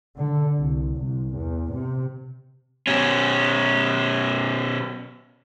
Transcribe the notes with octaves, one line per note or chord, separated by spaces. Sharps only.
D3
C2
C2
E2
C3
B2 C#4